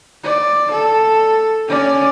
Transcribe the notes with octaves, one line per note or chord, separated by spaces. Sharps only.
D5
A4
C#4 D5